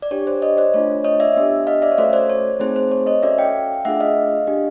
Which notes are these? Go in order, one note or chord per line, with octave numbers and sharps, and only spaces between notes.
D5
D4 G4 C#5
C5 D5
C#5 D#5
C5 D5
A3 D4 F4 C#5
C#5 D#5
D5 E5
B3 D4 G4
D#5 F5
D5 E5
C#5
A3 C#4 F#4 A4 C5 D5
C5 D5
C#5
A3 C4 D#4 G#4 C5
C5
C#5
C#5 D#5
C#4 F#4 A4 D5 E5
F5 G5
A3 D4 F4 G#4 E5 F#5
D#5 F5
D4 G4